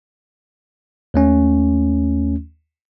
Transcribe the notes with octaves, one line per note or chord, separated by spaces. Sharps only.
D#2 A3 C#4